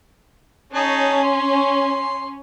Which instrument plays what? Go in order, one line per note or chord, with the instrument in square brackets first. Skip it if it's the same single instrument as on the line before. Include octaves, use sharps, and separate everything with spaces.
[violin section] C#4 [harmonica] D#4 G#4 A5
[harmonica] C6